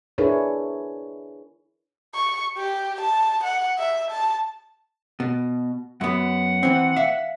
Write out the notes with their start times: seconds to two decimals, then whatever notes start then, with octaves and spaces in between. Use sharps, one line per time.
0.18 D4 E4 G#4 A#4 B4 C#5
2.15 C#6
2.57 G4
3.01 A5
3.44 F#5
3.79 E5
4.11 A5
5.20 B2
6.01 F#2 B3 F#5
6.63 E3 C4
6.96 E5 F5